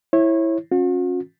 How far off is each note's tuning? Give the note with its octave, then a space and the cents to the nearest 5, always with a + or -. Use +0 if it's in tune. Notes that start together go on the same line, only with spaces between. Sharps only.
E4 +0 C#5 -30
C#4 -25 F#4 -45